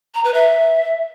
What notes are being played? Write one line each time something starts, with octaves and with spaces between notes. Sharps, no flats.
A#5
B4
E5